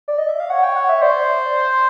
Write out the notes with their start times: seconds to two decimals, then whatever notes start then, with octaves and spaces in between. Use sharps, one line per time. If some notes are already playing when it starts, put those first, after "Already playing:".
0.08 D5
0.18 D#5
0.29 E5
0.40 F5
0.50 C#5 F#5
0.63 G5
0.76 F#5
0.89 E5
1.02 C5 D5